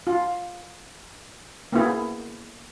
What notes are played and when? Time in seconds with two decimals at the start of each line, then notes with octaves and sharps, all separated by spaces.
0.07 F4
1.72 A#3 B3 E4 G#4